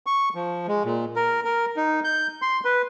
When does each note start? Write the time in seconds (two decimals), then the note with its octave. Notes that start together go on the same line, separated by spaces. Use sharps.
0.06 C#6
0.35 F3
0.68 G#3
0.85 A#2
1.16 A#4
1.45 A#4
1.77 D#4
2.04 G6
2.42 C6
2.65 B4